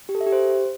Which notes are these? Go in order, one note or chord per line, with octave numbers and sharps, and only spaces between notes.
G4
A4
E5
G4
C5